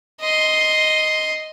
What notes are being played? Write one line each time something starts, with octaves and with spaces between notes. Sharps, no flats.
D#5 C6